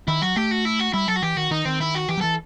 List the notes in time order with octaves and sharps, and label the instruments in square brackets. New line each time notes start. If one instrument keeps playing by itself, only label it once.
[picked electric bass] D#3 [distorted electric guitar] E4
[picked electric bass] F#3 [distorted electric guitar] F#4
[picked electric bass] A3 [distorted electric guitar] G4
[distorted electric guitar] F#4
E4
F#4
[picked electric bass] G3 [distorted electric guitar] E4
[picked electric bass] F#3 [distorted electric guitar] A4
[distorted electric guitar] F#4
[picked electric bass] E3 [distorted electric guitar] G4
[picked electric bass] D#3 [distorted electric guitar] F#4
[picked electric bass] D#3 [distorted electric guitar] D#4
[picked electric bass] D#3 [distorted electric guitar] C4
[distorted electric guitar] E4
F#4
[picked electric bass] E3 [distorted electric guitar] G4
[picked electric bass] F#3
[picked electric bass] E3 [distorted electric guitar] A4